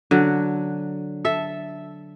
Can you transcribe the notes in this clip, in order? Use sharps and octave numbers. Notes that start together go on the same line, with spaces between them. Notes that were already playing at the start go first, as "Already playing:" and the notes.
D3 F#3
A4 E5